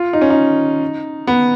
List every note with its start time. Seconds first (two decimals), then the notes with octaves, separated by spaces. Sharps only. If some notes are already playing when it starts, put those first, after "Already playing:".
Already playing: F4
0.13 D#4
0.21 C#4
0.30 D#4
1.27 B3